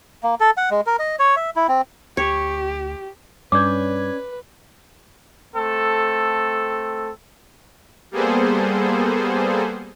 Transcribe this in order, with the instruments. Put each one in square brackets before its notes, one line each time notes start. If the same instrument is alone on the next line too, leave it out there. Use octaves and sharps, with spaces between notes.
[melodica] A#3
A4
F#5
G#3
A#4
D#5
C#5
E5
E4
C4
[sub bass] D2 [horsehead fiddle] G4 [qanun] C#5
[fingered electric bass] G2 [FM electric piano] C#4 D5 G#6 [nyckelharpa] B4 [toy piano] C#5 D6
[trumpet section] A3 C4 A4
[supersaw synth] G3 A#3 B3 G#4 A4 C5